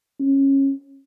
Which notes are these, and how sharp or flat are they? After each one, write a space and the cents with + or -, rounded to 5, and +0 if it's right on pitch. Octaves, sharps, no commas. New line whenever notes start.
C#4 -20